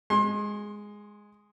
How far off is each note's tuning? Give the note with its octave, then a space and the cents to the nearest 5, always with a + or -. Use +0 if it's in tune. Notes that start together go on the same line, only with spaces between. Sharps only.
G#3 -5 C6 +30